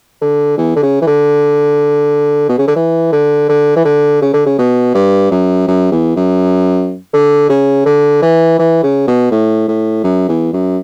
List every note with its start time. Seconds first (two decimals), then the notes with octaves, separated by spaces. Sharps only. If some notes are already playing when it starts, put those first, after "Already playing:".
0.21 D3
0.58 E2
0.76 D3
0.82 C#3
1.01 E3
1.07 D3
2.49 B2
2.58 C#3
2.67 D3
2.76 E3
3.12 D3
3.49 D3
3.76 E3
3.85 D3
4.22 C#3
4.33 D3
4.46 C#3
4.58 B2
4.94 G2
5.31 F#2
5.67 F#2
5.92 E2
6.16 F#2
7.13 D3
7.49 C#3
7.86 D3
8.22 E3
8.59 E3
8.83 C#3
9.07 B2
9.31 A2
9.68 A2
10.04 F#2
10.28 E2
10.53 F#2